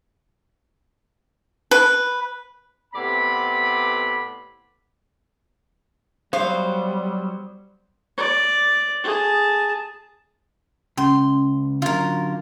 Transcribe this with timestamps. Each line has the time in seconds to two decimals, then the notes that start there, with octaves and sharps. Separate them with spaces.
1.71 B4
2.94 A2 C3 B3 D5 B5
6.33 F#3 G3 B3 C5 F5
8.18 D5
9.04 G#4 A5
10.97 C#2 C#4 C6
11.82 D3 F#3 F4 A#4